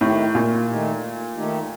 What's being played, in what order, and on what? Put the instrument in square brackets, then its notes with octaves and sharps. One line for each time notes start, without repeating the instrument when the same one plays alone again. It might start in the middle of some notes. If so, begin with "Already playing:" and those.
[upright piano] A2 [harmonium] D#3 A3 D#4 G4
[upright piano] A#2
[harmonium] D#3 A3 D#4 G4
D#3 A3 D#4 G4